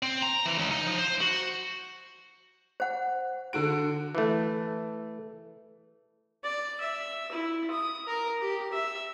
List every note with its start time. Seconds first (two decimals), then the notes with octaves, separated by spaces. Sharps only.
0.03 C4
0.22 A#5
0.46 E3
0.58 C#2
0.71 D#4
0.87 F3
0.98 C5
1.21 F#4
2.80 C5 F#5
3.53 D3 F#4 D7
4.15 E3 A3
6.44 D5
6.80 E5
7.32 E4
7.70 D#6
8.07 A#4
8.41 G4
8.73 E5